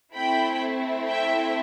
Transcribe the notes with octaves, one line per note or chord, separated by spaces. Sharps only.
A3 C4 E4 G5 B5
E5 G5